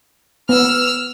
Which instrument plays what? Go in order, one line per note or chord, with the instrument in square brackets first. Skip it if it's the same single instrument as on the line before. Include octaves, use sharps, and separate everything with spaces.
[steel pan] B3 [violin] E6 F6